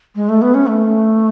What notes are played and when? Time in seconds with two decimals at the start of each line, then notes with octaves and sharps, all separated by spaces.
0.15 G#3
0.28 A3
0.41 B3
0.54 C#4
0.66 A3